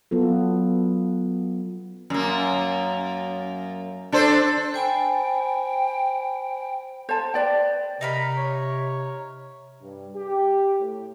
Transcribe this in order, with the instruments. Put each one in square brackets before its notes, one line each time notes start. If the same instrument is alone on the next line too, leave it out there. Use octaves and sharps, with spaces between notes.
[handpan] F#3 B3 F4 A4
[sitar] F#2 A#3
D4 A4 C5
[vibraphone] C5 G#5 B5 [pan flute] G5
[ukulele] C5 A5
B4 D5 G5
[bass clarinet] C3 [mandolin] D#4 A#4 B5
[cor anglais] C#5
[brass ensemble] G2
G4
A2